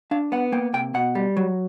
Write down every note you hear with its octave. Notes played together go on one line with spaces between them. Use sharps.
D4 F5
B3 F#5
A#3 G5
C3 G5
B2 F#5
G3
F#3